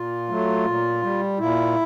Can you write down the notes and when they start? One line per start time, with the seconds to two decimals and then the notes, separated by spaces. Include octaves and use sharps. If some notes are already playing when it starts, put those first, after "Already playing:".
Already playing: A#2 F4
0.29 F#3 A3
0.65 A#2
1.02 G3
1.39 A#2 E4